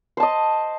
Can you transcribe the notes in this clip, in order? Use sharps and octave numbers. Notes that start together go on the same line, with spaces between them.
C5 D#5 A5